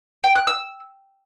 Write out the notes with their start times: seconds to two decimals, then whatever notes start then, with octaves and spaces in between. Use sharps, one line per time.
0.24 G5
0.35 F#6
0.47 E6